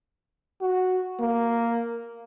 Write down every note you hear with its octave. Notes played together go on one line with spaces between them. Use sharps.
F#4
A#3